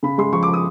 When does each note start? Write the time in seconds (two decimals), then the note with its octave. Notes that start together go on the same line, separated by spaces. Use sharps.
0.03 C#3 B5
0.18 G#3 C6
0.33 F3 C#6
0.43 D6
0.48 F3
0.54 D#6